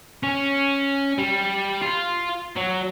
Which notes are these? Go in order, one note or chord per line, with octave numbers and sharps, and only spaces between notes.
C#4
G3
F4
F#3